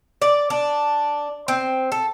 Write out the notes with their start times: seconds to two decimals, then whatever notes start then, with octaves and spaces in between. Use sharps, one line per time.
0.22 D5
0.50 D4
1.48 C4
1.92 A4